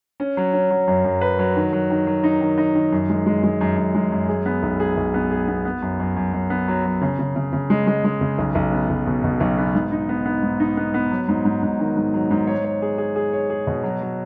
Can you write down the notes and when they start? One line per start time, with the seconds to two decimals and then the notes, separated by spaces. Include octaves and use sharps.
0.20 C#4
0.37 F#3
0.53 C#4
0.70 F#3
0.88 F#2
1.05 F#2
1.21 B4
1.39 F#3
1.56 D#3
1.73 F#3
1.90 D#3
2.07 F#3
2.24 D#4
2.41 D#3
2.58 D#4
2.75 D#3
2.92 F#2
3.10 G#3
3.26 G#3
3.44 G#3
3.61 F#2
3.78 F#2
3.94 G#3
4.12 F#2
4.29 G#4
4.46 B3
4.63 B1
4.80 G#4
4.97 B1
5.14 B3
5.31 G#4
5.48 B3
5.65 B3
5.82 F#2
5.99 F#2
6.16 F#2
6.33 F#2
6.50 B3
6.68 F#3
6.85 F#3
7.01 C#3
7.19 C#3
7.36 C#3
7.53 C#3
7.70 G#3
7.87 G#3
8.04 G#3
8.21 C#3
8.38 B1
8.55 B1
8.72 B3
8.89 B1
9.06 B2
9.24 B2
9.40 B1
9.58 B3
9.74 G#2
9.92 D#4
10.09 B3
10.26 B3
10.43 G#2
10.60 D#4
10.77 B3
10.94 B3
11.11 F#3
11.28 G#2
11.45 G#2
11.63 G#2
11.79 D#3
11.96 G#2
12.14 F#3
12.31 G#2
12.47 C#5
12.64 C#5
12.82 G#4
12.98 G#4
13.16 G#4
13.33 C#5
13.50 G#4
13.67 B2
13.83 F#3
14.01 F#3